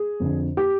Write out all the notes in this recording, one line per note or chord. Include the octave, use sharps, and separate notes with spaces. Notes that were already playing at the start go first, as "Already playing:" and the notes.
Already playing: G#4
F2 D3
G4